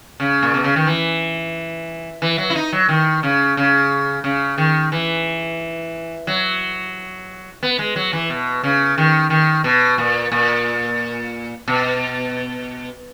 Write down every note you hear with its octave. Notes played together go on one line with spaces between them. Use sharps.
C#3
A#2
B2
C#3
D#3
E3
E3
F#3
E4
D#4
F#3
D#3
C#3
C#3
C#3
D#3
E3
F#3
B3
G#3
F#3
E3
B2
C#3
D#3
D#3
B2
A#2
A#2
B2